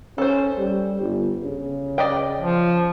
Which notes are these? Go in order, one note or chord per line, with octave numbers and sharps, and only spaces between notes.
C#4 A4 C5
G3
G1
C#3
D5 D#5 G5
F3